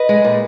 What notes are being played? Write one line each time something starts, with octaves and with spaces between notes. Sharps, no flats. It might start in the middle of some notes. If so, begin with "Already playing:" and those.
Already playing: B4 D#5
G#3
A#2